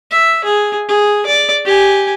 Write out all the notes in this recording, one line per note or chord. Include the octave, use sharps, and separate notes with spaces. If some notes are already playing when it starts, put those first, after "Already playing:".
E5
G#4
G#4
D5
G4 G#5